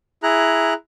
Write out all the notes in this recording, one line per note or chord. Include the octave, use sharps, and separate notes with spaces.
E4 G#4 A#5 F#6